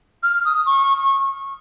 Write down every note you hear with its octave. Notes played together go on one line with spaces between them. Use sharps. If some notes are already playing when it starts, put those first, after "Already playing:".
F6
D#6
C#6